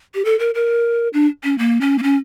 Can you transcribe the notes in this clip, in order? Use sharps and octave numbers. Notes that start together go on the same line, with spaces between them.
G4
A4
A#4
A#4
D4
C#4
A#3
C#4
A#3
C#4